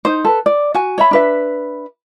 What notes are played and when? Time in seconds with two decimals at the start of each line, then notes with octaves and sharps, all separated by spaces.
0.05 D#4 C5
0.25 A4 B4
0.46 D5
0.74 F#4 G#5
0.98 C#5 E5 B5
1.11 D4 B4 E5